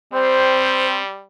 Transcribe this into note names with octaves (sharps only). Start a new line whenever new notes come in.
G3 C4 C5